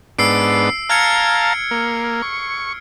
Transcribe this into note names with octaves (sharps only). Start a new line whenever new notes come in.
G#2 B3 D4 E6 C7 D7
F5 A5 A#5 F6 G#6 C#7
A#3
C#6